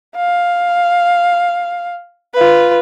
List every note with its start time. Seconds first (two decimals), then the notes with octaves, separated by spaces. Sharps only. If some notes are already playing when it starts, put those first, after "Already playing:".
0.16 F5
2.34 F4 B4